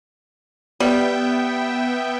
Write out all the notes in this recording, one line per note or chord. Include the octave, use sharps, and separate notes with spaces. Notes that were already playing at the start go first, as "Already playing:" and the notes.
G3 B3 E5 G5